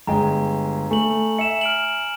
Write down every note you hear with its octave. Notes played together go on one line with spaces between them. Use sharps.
G1 G#3 G5 A#5
A3 G#5 F#7
E5 C#7 E7
F6 D7 F#7